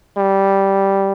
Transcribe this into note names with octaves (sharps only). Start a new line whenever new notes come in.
G3